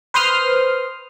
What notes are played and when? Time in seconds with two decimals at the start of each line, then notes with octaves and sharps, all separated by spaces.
0.14 B4 C5 C6 D#6 F6